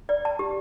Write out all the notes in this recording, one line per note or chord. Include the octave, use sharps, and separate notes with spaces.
D5
A5
G4